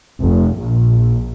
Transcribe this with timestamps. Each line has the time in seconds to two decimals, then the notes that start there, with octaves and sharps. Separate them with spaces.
0.21 F1
0.57 A#1